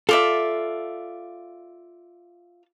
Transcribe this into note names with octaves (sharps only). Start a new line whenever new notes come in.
F4 A4 D5 E5